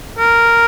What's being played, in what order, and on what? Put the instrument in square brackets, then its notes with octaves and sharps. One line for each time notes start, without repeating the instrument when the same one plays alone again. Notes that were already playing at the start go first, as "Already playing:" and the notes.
[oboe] A#4